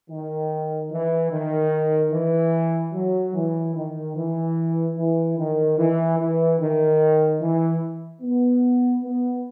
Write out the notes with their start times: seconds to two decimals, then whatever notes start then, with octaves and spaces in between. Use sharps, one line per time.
0.10 D#3
0.91 E3
1.31 D#3
2.12 E3
2.94 F#3
3.35 E3
3.75 D#3
4.16 E3
4.97 E3
5.38 D#3
5.78 E3
6.19 E3
6.60 D#3
7.41 E3
8.22 B3
9.03 B3